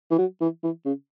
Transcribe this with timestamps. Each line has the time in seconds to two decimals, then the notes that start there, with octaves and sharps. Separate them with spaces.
0.11 E3
0.18 F#3
0.41 E3
0.63 E3
0.85 C#3